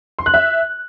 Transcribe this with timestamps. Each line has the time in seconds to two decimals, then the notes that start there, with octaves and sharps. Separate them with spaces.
0.19 C6
0.26 F#6
0.34 E5